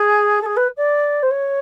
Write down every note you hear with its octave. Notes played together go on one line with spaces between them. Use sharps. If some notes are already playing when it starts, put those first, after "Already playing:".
Already playing: G#4
A4
G#4
B4
D5
C5
C#5